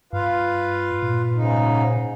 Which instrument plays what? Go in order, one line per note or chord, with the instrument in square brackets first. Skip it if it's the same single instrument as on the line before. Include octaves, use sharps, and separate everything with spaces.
[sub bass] G2 [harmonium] F4 B4 F5
[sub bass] A#2
[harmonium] G#2 C#3 D#4